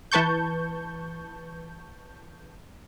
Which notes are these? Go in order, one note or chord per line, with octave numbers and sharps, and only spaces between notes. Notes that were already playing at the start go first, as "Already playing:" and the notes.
E3 B4 A5 C#6 G6